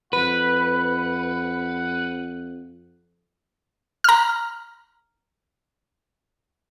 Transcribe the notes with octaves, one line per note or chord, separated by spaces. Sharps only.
F2 B4 F#5
A#5 F6